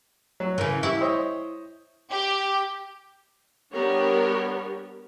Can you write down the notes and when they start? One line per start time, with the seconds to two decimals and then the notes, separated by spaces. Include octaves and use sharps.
0.40 F#3
0.58 C#3 E3 A#4
0.83 E4 G4 C#6
1.01 C5 C#5 D#5
2.11 G4
3.73 G3 B3 D4 G4 A#4 C#5